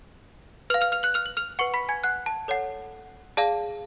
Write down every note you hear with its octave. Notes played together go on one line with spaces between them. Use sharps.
B4 F5 F6 F7
F6 F7
F6 F7
F#6 F#7
F6 F7
F#7
F6 F7
B4 F#5 C#6 C#7
B5 B6
G#5 G#6
F#5 F#6
A5
A4 C#5 F#5
G#4 D5 F5 A5